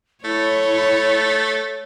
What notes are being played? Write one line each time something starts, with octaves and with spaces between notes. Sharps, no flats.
A3 E4 C#5